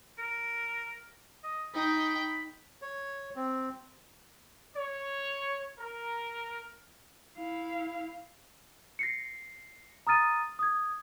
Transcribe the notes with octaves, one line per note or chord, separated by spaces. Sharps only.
A#4
D#5
D#4 G5 B5
C#5
C4
C#5
A#4
E4 F5
A#6 C7 C#7
A#5 D#6 F6 A6 D#7
D#6 G#6